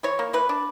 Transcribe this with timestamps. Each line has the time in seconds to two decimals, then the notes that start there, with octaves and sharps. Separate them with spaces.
0.03 E3 C#5
0.19 A#3
0.33 E3 B4
0.49 D4